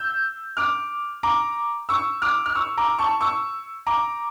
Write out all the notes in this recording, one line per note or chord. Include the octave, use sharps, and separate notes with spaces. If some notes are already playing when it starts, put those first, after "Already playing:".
Already playing: E6 G6
D6 F6
A#5 D6
C#6 E6
D6 F6
F6
C#6 E6
A#5 D6
A5 C#6
C#6 E6
A#5 D6